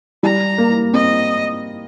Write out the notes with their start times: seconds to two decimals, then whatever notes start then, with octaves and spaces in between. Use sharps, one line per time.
0.23 G3 A#5
0.58 A#3
0.93 C4 D#5